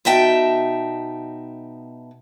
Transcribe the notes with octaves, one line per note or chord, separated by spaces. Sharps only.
B2 D#4 E5 G5 A5